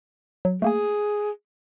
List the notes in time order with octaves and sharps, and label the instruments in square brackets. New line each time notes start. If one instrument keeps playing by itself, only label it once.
[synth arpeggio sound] F#3
[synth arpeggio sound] A3 A#3 G#5 [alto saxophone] G#4